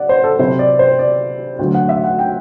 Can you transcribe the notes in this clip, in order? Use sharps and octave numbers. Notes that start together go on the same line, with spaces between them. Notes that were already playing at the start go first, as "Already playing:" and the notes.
Already playing: D5 F#5
C5
A4
C3 F#3 C4 E4 C5
D5
C5
D5
D2 D3 F#3
F#5
E5
F#5
G5